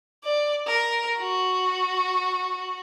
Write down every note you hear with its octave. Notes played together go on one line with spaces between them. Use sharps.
D5
A#4
F#4